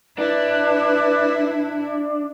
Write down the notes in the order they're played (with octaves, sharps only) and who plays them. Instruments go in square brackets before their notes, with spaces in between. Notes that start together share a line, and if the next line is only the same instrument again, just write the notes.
[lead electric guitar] D4 [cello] E4 [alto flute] B4